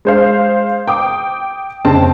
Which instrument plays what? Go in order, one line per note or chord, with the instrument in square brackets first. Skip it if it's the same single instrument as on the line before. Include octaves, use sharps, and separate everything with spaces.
[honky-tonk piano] G#3 C5 F5
G5 D6 D#6
F1 C#3 C4 G5 A5